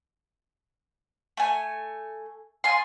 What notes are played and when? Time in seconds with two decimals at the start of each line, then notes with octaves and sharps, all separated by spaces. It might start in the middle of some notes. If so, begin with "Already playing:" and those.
1.37 A3 G#5
2.64 F4 G#4 C6